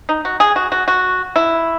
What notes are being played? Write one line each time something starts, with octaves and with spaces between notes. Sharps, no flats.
D#4
F#4
G#4
F#4
F#4
F#4
E4